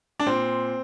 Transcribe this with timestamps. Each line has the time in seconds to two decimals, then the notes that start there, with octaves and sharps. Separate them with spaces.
0.20 D4
0.26 A#2 C4